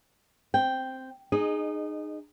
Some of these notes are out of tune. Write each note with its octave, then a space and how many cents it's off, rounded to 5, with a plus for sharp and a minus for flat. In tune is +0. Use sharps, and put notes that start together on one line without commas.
C4 +0 G5 +0
D#4 -25 G#4 +0 D#5 -10